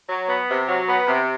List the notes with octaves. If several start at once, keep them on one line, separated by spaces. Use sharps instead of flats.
F#3
B3
C3
F#3
B3
C3